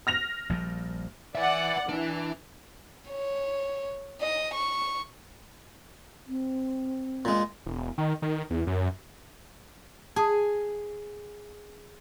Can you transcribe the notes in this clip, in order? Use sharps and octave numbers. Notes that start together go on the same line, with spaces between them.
F6 A#6 F7
A#1 F3 G3
B4 D5 E5 F#5
E3 D4
C#5
D#5
C#6
C4
A#2 G#3
E1
D#3
D#3
E2
F#2
G#4 A5 D#6